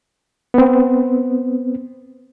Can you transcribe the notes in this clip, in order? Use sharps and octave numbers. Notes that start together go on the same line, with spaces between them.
B3 C4